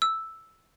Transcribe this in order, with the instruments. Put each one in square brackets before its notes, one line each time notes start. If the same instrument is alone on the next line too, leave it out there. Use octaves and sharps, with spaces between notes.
[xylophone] E6